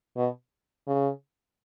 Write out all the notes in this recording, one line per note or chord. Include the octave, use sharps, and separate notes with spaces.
B2
C#3